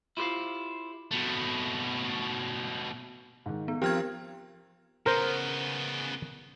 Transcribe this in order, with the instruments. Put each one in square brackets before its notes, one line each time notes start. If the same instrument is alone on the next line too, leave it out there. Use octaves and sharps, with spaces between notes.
[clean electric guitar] E4 F4 G4 B4 C5 F5
[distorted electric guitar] B2 A3
[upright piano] G#2 D#3
[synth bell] B3
[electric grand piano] F3 C4 A#4 [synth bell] G4 F6 G#6 [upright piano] G5
[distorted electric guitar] C#3 B3 [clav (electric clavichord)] A#4 C5